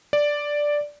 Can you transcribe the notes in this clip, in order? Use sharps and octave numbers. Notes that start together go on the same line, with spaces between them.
D5